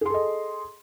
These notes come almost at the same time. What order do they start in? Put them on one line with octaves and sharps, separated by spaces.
G#4 C6 A4 D#5